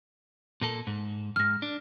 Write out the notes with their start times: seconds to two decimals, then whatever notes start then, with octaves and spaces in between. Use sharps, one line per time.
0.61 A#2 A#3 A4
0.87 G#2
1.36 F2 G#2 F6 A#6
1.62 D4